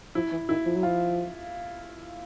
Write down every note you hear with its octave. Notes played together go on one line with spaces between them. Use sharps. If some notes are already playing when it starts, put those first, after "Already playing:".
F3 E4
E3
D#3 E4
F3
F#3
F3 F4